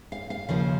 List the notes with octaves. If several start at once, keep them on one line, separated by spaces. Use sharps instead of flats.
F5
F5
D#2 C#3 F3 F5